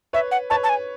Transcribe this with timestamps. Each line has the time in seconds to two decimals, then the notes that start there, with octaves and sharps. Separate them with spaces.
0.13 B4 C#5 E5
0.31 F#5
0.50 B4 C#5 A5
0.64 A5
0.69 G#5